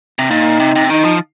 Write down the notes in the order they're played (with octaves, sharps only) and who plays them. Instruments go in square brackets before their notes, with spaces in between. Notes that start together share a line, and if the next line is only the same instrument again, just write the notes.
[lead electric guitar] C3
[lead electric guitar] A#2 [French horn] D#4
[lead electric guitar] C3
C3
[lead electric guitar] D#3 [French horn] D#4
[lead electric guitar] F3